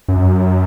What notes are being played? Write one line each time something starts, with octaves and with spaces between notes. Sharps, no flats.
F#2